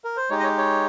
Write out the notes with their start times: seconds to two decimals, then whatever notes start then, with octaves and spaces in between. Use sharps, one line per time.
0.04 A#4
0.17 C5
0.30 G#3 D#4 G4 C#5
0.39 D#5
0.43 C#5
0.58 C#5